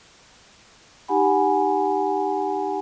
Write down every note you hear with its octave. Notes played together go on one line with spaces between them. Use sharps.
D#4 G4 F#5 G#5 B5